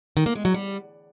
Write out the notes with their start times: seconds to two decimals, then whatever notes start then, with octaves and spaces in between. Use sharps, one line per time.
0.17 D#3
0.26 A#3
0.35 G#3
0.45 F#3
0.54 G3